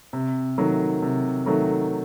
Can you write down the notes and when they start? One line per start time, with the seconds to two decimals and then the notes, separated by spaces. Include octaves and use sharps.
0.13 C3
0.58 D#3 F#3 A3
1.02 C3
1.46 D#3 F#3 A3